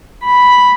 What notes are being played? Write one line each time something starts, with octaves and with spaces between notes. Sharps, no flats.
B5